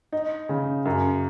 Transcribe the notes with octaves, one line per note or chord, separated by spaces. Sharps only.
D#4
C#3
F#2